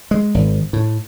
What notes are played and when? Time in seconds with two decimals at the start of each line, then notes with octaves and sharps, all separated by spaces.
0.11 G#3
0.34 G#1
0.73 A2